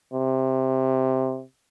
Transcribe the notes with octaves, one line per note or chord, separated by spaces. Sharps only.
C3